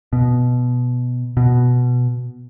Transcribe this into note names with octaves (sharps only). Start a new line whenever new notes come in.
B2
B2